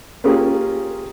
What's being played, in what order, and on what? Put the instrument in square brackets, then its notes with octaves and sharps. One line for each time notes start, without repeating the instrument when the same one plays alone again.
[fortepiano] A#3 C#4 F4 G4 G#4 A#4